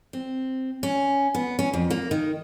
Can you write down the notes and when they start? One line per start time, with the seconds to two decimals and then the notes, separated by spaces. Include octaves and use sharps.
0.13 C4
0.83 C#4
1.35 B3
1.59 C#4
1.73 F2
1.90 A#3
2.11 D#3